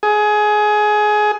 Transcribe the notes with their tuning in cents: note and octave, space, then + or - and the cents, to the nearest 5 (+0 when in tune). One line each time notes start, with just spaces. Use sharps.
G#4 +20